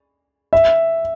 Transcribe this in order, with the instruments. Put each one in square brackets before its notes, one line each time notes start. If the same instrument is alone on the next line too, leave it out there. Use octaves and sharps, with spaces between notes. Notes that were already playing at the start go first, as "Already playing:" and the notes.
[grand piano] E5